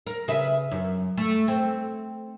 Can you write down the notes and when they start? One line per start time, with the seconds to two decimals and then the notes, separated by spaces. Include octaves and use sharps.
0.07 A#4
0.28 C#3 B4 E5
0.71 F#2
1.17 A3
1.48 C4